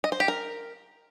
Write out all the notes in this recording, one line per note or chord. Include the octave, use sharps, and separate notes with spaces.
D#5
C5
G4
A#4